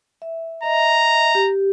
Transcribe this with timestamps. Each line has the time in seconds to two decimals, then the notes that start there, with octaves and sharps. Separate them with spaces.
0.22 E5
0.63 D#5 E5 A#5
1.35 G4